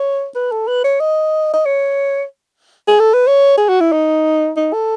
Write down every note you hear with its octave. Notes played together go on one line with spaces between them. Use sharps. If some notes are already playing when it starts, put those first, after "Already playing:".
Already playing: C#5
B4
A4
B4
C#5
D#5
D#5
C#5
G#4
A4
B4
C#5
G#4
F#4
E4
D#4
D#4
A4